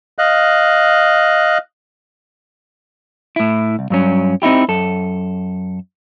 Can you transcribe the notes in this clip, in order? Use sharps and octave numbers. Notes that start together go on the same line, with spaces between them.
D#5 F5 F#6
A2 E4
C2
G2 F#3 C#4
C4 D#4 E4 G4
F#2 A4